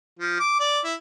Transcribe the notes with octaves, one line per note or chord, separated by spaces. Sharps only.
F3
D6
D5
E4